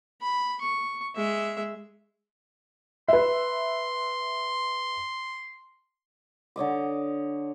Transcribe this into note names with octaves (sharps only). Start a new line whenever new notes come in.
B5
C#6
G#3 E5
B4 E5 C6
D3 C#5 D#5 D6